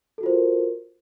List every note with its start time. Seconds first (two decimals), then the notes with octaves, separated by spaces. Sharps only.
0.18 A4
0.21 F#4
0.23 F4
0.26 C5
0.29 A#4